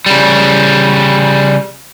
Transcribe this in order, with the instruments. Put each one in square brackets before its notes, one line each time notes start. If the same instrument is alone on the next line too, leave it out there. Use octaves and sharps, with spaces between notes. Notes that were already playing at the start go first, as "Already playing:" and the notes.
[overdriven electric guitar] C#3 G3